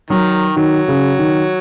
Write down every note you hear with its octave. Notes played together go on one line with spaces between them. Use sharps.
D#3 F#3
D#3 F#3
C#3
D#3